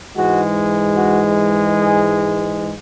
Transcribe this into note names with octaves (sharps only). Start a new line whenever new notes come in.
G#2 E3 G#3 F#4
F#4
G#4